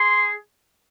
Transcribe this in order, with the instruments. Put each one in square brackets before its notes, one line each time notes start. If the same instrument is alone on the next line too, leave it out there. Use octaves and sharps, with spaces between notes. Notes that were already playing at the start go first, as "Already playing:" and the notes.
Already playing: [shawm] G#4 [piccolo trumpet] C6